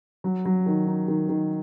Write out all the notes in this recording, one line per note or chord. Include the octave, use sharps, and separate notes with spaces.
F#3
F#3
D#3
D#4
D#3
D#3